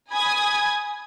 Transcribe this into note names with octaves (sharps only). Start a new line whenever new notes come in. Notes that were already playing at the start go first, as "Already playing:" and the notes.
G#5 B5 D#6 G#6